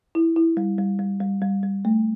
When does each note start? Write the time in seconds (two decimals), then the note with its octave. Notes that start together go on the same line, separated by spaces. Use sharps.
0.15 E4
0.36 E4
0.57 G3
0.78 G3
0.99 G3
1.21 G3
1.42 G3
1.63 G3
1.85 A3